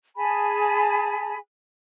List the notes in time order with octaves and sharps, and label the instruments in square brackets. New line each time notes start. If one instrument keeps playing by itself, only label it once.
[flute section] G#4 G#5 A5 B5